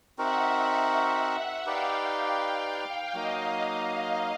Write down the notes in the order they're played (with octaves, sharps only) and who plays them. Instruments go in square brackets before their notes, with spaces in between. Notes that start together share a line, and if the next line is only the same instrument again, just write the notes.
[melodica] C4 D#4 F#4 A#4 [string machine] E5 F#5
[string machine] E5 F#5
[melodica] D#4 G4 B4 D5 [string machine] F5 G5
[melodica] F#3 A#3 D#4 [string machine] D#5 F5